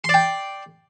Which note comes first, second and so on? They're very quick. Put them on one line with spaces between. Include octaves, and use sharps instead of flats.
C6 D5 G5